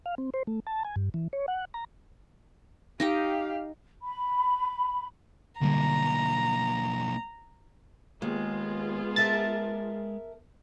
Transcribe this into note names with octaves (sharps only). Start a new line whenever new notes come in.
F5
C4
C5
A3
A5
G#5
G2
E3
C#5
F#5
A#5
D#4 G4 D#5 F5 G5
B5
B1 D3 G3 A#3 A#5
D#2 G#3 B3 F4 G#4
A#4 E5 A5 A6